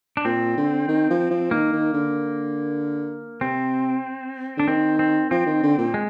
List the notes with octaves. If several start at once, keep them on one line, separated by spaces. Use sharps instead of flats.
D4
A#2 C4
D3
D#3
F3
F3
D#3 A#3
D#3
D3
C3 C4
D3 D4
D#3 C4
C4
F3 C4
D#3
D3
A#2
G#3